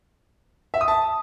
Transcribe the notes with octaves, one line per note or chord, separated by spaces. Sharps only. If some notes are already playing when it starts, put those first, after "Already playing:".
E5
D#6
A5